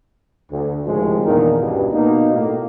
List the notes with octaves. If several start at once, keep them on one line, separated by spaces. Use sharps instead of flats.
D2
C#2 A2 C3 D#3 F3 G#3
E2 A#2 D#3 D4 D#4 A#4
C#2 G2 B2
B2 A#3 D#4
A2 A#3